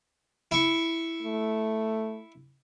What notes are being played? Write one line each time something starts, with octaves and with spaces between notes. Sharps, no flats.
E4 C#6
A3